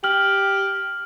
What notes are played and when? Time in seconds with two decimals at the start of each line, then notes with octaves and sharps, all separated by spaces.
0.04 G4 F6 F#7